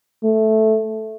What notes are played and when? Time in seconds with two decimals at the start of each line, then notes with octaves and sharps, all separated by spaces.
0.24 A3